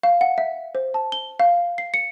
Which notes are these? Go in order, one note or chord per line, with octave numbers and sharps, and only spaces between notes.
F5
F#5
E5
C5
A5
G7
F5
C7
C#7